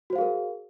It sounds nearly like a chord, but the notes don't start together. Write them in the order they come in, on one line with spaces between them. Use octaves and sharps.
F#4 C5 F5 G#4 A#4